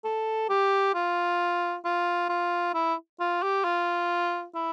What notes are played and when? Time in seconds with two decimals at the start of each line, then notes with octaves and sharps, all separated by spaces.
0.04 A4
0.49 G4
0.95 F4
1.85 F4
2.29 F4
2.74 E4
3.20 F4
3.43 G4
3.64 F4
4.55 E4